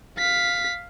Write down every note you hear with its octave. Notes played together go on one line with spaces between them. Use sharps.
F5 B6